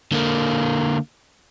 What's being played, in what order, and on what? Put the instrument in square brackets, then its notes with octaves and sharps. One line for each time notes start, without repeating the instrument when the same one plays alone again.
[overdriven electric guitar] D3 A#3